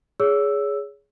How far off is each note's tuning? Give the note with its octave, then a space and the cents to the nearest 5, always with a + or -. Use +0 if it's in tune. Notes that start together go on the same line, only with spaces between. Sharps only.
G#4 +0 C#5 +25 E6 +0